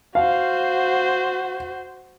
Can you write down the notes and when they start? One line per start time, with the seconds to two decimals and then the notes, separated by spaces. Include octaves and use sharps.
0.15 F#4 C5 F5